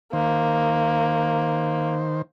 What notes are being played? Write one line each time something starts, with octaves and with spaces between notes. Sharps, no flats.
D#3 A#3 C5